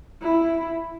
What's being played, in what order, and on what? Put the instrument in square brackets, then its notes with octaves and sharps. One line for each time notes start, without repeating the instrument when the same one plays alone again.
[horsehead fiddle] E4